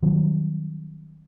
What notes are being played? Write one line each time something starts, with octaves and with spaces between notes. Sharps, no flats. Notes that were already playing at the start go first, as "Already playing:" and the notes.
D#3 F#3 G3 C4